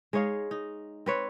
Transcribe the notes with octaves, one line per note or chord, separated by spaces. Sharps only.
G#3 D#4 C#5 F5
D#4
C4 B4 C#5